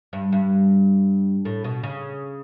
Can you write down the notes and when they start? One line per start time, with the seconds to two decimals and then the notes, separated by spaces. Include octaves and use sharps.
0.13 G2
0.32 G2
1.45 A2
1.64 B2
1.83 C#3